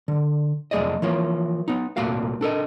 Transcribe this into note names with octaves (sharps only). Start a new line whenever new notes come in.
D3
C2 F2 A3 G#4 D5 D#5
E3 F3 A#3 C#5
B3 D#4
C2 A#2 A3 A#3 F#4 F5
D4 A4 A#4 D#5